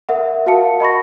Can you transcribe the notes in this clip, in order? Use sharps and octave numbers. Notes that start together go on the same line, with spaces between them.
A#4 E5 F#5
F#4 A#4 F5 F#5 A5 C#7
D#5 B5 C#6 A#6